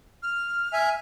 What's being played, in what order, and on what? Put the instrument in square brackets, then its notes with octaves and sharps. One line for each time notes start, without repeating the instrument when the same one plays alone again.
[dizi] F6
[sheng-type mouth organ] E5 G#5